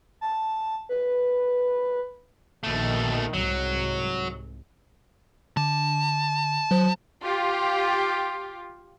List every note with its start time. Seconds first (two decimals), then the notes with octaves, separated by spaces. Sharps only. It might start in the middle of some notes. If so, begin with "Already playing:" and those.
0.21 A5
0.89 B4
2.63 A#1 B2 D#3 A3
3.33 C2 G#2 F#3
5.57 D3 A5
6.71 F#3 C5
7.22 F4 G4